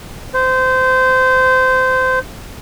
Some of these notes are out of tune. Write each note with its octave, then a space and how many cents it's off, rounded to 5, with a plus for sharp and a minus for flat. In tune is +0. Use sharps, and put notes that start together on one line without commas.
C5 -20